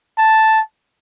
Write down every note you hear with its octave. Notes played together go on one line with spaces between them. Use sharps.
A5